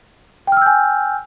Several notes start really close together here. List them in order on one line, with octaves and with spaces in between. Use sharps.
G5 F6 E6 G6 G#5